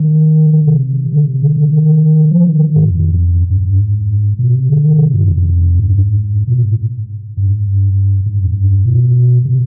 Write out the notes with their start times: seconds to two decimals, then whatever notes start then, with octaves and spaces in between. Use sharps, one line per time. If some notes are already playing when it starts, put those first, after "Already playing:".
Already playing: D#3
0.53 D#3
0.67 C3
1.12 D3
1.27 C3
1.42 D3
1.56 D3
1.72 D#3
2.31 F3
2.45 D#3
2.61 D#3
2.76 G#2
2.90 F2
3.50 G2
3.59 F2
3.65 G2
3.80 G#2
4.39 B2
4.54 C3
4.69 D3
4.85 D#3
4.98 C3
5.14 G2
5.29 F2
5.79 G#2
5.88 G2
6.03 G#2
6.47 B2
6.63 G#2
7.37 G2
7.51 G#2
7.67 G2
8.26 G#2
8.35 G2
8.44 F2
8.53 G2
8.85 B2
9.45 C3